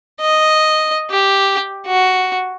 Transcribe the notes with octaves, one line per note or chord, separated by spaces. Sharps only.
D#5
G4
F#4